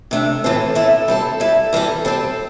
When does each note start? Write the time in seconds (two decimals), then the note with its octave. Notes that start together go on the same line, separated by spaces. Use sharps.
0.11 C3 A3 D4
0.44 A2 E3 C4 A4
0.75 A2 A3 E4 A4
1.08 G3 C4 A4
1.40 G3 E4 A4
1.73 E3 G3 C4 A4
2.05 G3 C4 A4